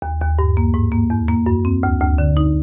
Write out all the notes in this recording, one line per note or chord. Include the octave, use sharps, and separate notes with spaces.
D#2
D#2
G2
A#3
G#2
A#3
E2
A#3
F#2
C4
D2
D2
D3
D#4